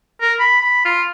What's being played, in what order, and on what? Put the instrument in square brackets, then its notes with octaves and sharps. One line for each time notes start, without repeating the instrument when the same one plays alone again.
[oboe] A#4
B5
B5
F4